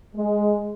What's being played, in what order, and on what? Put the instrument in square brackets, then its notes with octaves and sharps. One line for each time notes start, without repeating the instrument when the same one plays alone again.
[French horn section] G#3